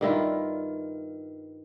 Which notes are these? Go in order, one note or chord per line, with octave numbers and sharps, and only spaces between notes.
G2 D#3 E4 F4